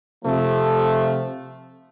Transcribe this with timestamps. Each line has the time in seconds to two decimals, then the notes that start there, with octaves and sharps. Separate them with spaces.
0.25 C3 F3 A3